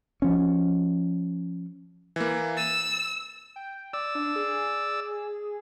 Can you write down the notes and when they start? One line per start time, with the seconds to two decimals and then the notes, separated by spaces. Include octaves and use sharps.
0.22 F3 C#4
2.16 E3 A#3
2.57 E6 A6 D#7
3.56 G5
3.93 D5 E6
4.15 D4
4.36 G#4